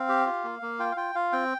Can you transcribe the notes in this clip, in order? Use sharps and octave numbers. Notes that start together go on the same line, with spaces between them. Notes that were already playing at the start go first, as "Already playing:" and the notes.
Already playing: C4 F5
G4
F4
A#3
A#3
F4 G5
F5
F4 G5
F4 F5
C4 G5